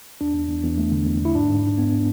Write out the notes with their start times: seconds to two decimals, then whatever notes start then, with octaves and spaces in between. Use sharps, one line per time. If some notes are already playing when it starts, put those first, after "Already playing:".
0.21 E2 D4
0.34 E2
0.48 E2
0.63 E2
0.78 A3
0.92 D3
1.06 E2
1.20 E2
1.25 E4
1.34 G#2 D4
1.50 G#2
1.63 G#2
1.78 B3